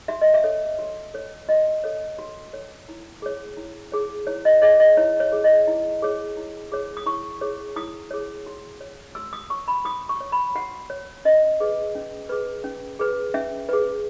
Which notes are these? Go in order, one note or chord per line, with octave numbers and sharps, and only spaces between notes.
F#4 E5
D#5
E5
A4 C#5
F#4
A4 C#5
F#4 D#5
A4 C#5
F#4
A4 C#5
E4
G#4 C#5
E4
G#4 C#5
E4 C#5
D#5
G#4 C#5 D#5
D#5
E4 C#5
C#5
G#4 C#5
D#5
E4
G#4 C#5
E4
G#4 C#5
D#6
E4 C#6
G#4 C#5
E4 D#6
G#4 C#5
F#4
C#5
F#4 E6
D#6
C#5 C#6
B5
F#4 D#6
C#6
C#5
B5
F#4 F#5
C#5
C#4 D#5
G#4 B4
C#4
G#4 B4
C#4
G#4 B4
C#4 E5
G#4 B4